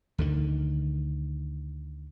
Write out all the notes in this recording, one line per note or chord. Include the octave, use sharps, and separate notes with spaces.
D2 D3 D#3